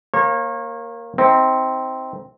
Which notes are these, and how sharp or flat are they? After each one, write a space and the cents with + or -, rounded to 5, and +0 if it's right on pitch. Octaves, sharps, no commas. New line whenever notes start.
A#3 +0 C#5 -35
C4 +0 D#4 +40